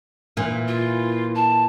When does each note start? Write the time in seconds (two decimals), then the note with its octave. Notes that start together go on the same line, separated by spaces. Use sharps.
0.37 A#2 E3
0.67 F4
1.35 A5